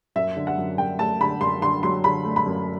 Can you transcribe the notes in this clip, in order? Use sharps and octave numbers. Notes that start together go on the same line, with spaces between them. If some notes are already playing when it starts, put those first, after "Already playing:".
F#2 E5
D3
F#5
F#2
F#2 G5
A3 A5
D3 B5
F#2 C6
D3 C6
F#3 C6
D3 B5
A3
B5
F#2